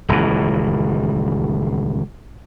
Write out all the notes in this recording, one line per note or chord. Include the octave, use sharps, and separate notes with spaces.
D#1 C#2 F#2 E3